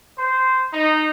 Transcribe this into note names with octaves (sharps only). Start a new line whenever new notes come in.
C5
D#4